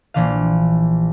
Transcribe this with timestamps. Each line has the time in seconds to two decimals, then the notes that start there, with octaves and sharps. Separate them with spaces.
0.14 A#1 E3 F5